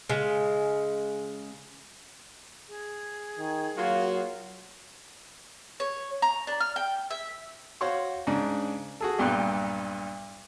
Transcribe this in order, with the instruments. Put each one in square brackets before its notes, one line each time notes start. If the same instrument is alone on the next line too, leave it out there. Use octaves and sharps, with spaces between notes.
[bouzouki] C#3 G#3
[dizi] G#4
[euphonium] D#3
[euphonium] F#3 [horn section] A#3 F4 F#4
[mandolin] C#5
A#5
D4
F6
G5
E5
[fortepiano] F#4 C5 C#5 F5 C6 C#6
G#2 C#3 D4
F#4 G#4 A4
B1 G2 A#2 G5 F#6